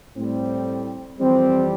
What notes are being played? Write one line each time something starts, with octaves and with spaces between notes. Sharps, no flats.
A2 G3 C4
F2 E3 G3 C4